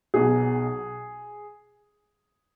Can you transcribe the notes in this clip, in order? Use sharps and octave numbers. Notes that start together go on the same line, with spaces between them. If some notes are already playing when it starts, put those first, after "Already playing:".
B1 B2 F#3 G#4